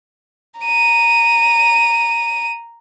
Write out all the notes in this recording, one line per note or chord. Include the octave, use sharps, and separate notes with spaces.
A#5 D#7